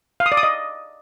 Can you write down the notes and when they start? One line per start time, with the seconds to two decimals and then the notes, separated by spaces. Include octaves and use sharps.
0.20 F5
0.26 D#6
0.32 D5
0.37 D#6
0.43 D#5